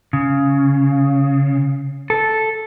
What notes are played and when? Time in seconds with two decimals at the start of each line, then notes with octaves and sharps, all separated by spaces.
0.13 C#3
2.10 A4